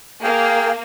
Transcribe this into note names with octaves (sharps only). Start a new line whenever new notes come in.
A#3 G#4 F5 G5